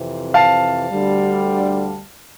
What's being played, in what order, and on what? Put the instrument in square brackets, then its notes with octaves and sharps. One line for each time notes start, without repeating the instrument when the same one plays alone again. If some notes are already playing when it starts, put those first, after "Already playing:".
Already playing: [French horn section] F2 C3 E3
[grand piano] F5 A5
[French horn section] D2 D3 G3